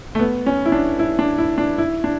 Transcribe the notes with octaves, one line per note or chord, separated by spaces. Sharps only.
A3
B3
C#4
E4
D4
E4
D4
E4
D4
E4
D4